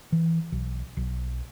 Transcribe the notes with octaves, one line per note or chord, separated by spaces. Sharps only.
E3
B1
B1